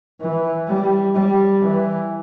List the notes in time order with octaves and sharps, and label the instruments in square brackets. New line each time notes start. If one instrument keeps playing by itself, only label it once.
[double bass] E3
G3
G3
E3